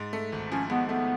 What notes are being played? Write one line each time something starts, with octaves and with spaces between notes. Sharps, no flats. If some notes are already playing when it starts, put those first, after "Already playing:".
Already playing: G#2
A3
G#1
F3 C#4
G#2 B3
A3 B3